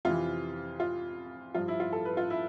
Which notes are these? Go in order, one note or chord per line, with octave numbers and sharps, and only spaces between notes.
F2 C3 E3 F4
F4
G2 F3 F4
E4
F4
A4
B4
F4
E4